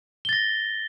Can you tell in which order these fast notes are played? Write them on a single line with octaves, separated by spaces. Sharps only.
G7 A6 A#6